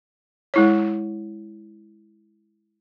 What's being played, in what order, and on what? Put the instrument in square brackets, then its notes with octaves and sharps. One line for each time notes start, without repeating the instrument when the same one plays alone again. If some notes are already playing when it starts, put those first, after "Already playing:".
[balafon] G#3 E4 C#5